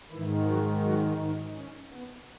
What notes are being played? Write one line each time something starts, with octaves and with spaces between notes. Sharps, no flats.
G#2 D#3 E3 E4
F#3 F#4
F#3 F#4
D#3 D#4
C#4
B3